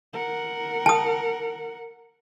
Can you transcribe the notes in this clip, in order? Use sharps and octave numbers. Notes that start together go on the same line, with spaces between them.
A#4 F#5
A5 D#6